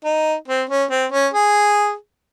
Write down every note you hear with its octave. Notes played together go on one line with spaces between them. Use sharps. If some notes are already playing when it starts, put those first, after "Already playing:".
D#4
C4
C#4
C4
C#4
G#4